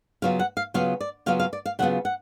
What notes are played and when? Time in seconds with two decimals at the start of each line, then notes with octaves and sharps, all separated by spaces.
0.22 C#3 F#3 B3 F4 F5
0.39 F#5
0.57 F5
0.74 C#3 F#3 B3 F4 F5
1.01 D5
1.26 C#3 F#3 B3 F4 F5
1.40 F5
1.53 D5
1.66 F5
1.79 C#3 F#3 B3 F4 F#5
2.05 F#5